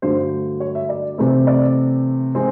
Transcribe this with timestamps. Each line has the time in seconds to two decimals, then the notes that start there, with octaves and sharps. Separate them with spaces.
0.02 G2 D3 F#3 A3 C5
0.60 C#5
0.75 E5
0.89 D5
1.18 C3 E3 A3 C4
1.47 D5
2.35 E3 G#3 C4